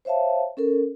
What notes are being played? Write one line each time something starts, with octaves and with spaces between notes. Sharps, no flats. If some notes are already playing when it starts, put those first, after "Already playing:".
C5 C#5 E5 F5 A5
C#4 A4 A#4